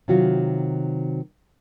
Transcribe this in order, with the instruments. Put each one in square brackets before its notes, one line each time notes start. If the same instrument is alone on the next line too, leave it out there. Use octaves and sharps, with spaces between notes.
[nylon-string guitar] C3 D#3 F#3 F4 F#4